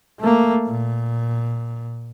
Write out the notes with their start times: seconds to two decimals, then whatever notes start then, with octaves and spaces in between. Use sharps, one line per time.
0.20 A3 A#3
0.67 A#2